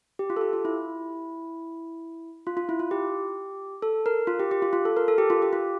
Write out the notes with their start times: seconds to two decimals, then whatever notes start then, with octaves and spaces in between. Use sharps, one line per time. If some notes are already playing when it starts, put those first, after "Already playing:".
0.19 G4
0.30 F4
0.36 A4
0.41 G4
0.53 F4
0.65 E4
2.47 F4
2.57 F4
2.69 E4
2.79 F4
2.91 G4
3.82 A4
4.06 A#4
4.27 F4
4.39 G4
4.51 G4
4.62 F4
4.73 F4
4.85 A4
4.97 A#4
5.08 A4
5.18 G4
5.30 F4
5.42 G4
5.53 F4